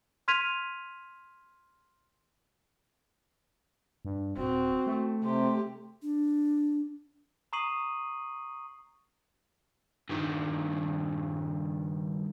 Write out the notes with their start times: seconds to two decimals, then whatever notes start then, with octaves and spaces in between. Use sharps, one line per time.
0.28 C6 F6 G#6 B6 D#7 F7
4.05 G2
4.37 D#1 C4 F#4
4.87 A3
5.24 C3 G4 C6
6.02 D4
7.53 A#5 C#6 D#6 C7 D#7 F#7
10.09 G2 D#3